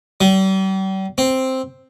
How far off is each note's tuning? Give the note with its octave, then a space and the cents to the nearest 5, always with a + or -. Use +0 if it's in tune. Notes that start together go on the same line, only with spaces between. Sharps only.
G3 -40
C4 +0